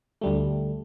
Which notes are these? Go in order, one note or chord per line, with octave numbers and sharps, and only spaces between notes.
D2 G3 A3